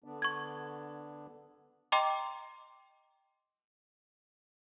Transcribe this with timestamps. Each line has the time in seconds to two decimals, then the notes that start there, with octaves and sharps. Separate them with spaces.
0.04 D3 B3 D4
0.22 C#6 G#6
1.92 D#5 G5 A#5 C6 D6